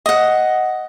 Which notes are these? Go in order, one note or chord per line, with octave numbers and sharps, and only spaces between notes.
D#5 F#5